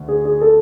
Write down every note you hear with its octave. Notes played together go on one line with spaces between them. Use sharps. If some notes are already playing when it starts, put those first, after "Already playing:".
Already playing: D2
G#4
G#4
A4